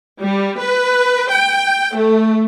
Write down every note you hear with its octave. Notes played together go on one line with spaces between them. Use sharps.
G3
B4
G5
A3